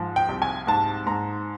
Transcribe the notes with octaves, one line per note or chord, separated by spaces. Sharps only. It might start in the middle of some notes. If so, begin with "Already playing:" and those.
Already playing: G#2 F3
G5
C2
G#5
G#2 A5
G#2 A#5